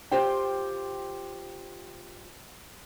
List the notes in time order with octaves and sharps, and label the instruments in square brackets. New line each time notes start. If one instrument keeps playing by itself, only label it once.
[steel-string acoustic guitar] F4 G4 C5 G5